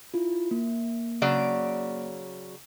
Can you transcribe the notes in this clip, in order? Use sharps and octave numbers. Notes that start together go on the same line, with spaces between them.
E4 F4
A#3
C#3 F#3 D5